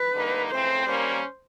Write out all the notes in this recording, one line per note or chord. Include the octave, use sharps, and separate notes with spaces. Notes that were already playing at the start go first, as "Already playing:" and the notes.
Already playing: B4
D3 G3 A#3 D#4
C#3 E3 A3 C4 C5
G3 A#3 C#4